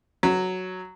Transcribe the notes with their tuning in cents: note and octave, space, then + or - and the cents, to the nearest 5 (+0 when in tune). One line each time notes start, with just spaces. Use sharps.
F#3 +0